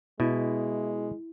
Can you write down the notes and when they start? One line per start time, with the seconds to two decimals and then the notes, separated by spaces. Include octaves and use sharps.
0.20 B2 G#3 E4